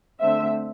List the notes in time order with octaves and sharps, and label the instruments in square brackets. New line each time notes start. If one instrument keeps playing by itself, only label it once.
[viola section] D3 A3 C4 E5